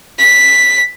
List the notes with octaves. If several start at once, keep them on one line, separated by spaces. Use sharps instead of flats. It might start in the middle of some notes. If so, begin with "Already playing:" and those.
B6